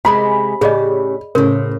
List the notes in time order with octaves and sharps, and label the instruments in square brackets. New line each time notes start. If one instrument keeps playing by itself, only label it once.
[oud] C3 G#3 G#4 [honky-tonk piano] B5
[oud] A2 C#3 G4 [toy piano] G#4 D5 D#5
[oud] A2 C5 [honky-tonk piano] C#3 [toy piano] A#4